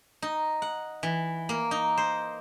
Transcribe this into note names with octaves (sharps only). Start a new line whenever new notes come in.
D#4
F#5
E3
A#3
D#4
C5